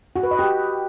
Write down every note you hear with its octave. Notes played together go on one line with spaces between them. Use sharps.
F#4
B4
D#5
G4